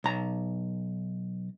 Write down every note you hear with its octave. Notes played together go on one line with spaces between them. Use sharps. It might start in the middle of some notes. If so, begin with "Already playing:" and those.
B1 A#5